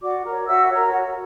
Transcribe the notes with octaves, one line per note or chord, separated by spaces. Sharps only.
F#4 D5 D6
A#4 C#5
F#4 E5 E6
C#5
A#4
F#4